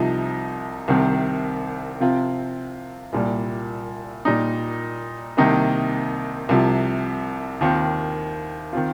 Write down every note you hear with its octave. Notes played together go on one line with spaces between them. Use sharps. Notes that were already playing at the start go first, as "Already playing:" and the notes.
Already playing: C2 C3 F3 D#4
C2 C3 D#3 C4
C3 F3 C4 F4
C2 A#2 G3
A#2 G3 D#4
C2 C3 D#3 A#3 D#4
C2 C3 F3
D#2 D#3 C4 F4
D#3 C4 F4